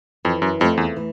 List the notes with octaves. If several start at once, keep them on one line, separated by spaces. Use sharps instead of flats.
F2 E3
F#2
F2 A3 C4 F4
E2
E3